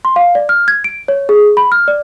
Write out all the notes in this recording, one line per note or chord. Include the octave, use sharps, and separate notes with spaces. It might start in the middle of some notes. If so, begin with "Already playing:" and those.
C6
F5
D5
F6
G#6
D7
C#5
G#4
B5
F6
D5